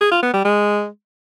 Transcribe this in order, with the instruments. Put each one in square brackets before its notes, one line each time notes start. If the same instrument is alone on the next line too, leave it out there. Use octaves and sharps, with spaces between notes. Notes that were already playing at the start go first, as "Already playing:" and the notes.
[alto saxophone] G#4
F4
B3
G3
G#3